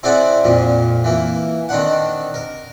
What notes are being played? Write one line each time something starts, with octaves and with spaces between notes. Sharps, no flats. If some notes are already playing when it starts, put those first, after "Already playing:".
C4 E4 G#4 C5 D5 F#5
F2 A#2 F3
E3 A#3
D#3 C4 D4 F#5
A#4